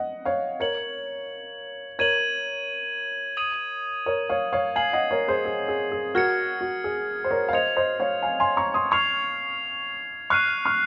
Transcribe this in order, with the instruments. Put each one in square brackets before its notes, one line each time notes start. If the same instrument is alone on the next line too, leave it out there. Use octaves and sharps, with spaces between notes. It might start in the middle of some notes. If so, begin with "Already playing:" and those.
Already playing: [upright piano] D#5 F#5
C#5 F5
[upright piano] A#4 C#5 [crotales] G#6 C#7 F#7
[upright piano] A#4 C#5 [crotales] G#6 D#7 F#7
[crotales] D#6 G#6 D#7 F#7
[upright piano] A#4 C#5
C#5 F5
C#5 F5
[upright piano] F5 G#5 [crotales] G#6 C7 F#7
[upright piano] D#5 F#5
A#4 C#5
G#4 C5
G#4
G#4
G#4
[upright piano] F#4 A#4 [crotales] F6 G#6 C#7
[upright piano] F#4
G#4
C5
A#4 C#5
F5
[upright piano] C5 D#5 [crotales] G#6 C#7 F7
[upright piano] C5 D#5
C#5 F5
F5 G#5
G#5 C6
A#5 C#6
C6 D#6
[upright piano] C#6 F6 [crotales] G#6 C7 F7
[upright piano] C#6 F6 [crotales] F#6 C7 D#7
[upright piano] C#6 F6